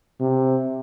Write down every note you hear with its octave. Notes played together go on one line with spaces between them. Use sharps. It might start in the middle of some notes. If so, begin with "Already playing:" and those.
C3